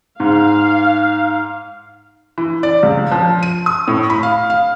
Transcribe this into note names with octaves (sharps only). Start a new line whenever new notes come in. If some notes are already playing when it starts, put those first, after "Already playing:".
G#2 F5
E3
D5
C#2
F3
D#7
D#6
A2
B5
F5
F5